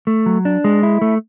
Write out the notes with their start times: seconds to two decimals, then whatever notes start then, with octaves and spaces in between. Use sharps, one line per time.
0.07 A3
0.26 F#3
0.45 D4
0.64 G#3
0.83 E4
1.01 A3